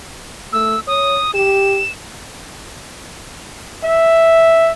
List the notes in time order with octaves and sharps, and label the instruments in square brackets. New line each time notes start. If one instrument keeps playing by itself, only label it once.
[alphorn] A3 [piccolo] E6
[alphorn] C#5 [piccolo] D#6
[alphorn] G4 [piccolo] E7
[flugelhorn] E5